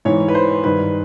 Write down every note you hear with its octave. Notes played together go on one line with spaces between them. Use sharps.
G#2 E3 C#5
B4
C5
G2 D#3 B4